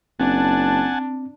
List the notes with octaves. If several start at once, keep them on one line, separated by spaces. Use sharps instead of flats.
F#1 C4 D4 F#5 G#5 A5